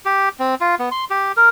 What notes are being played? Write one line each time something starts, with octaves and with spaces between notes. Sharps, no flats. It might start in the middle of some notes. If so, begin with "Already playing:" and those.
G4
C4
F4
B3
C6
G4
A#4